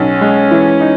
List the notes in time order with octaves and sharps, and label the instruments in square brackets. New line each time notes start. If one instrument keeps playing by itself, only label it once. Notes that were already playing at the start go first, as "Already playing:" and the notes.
Already playing: [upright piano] B1 [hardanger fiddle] C#4
[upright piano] G#3
E3
D#4